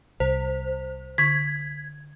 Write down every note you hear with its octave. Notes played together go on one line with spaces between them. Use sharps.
C2 C5
D3 C#6 G#6 B6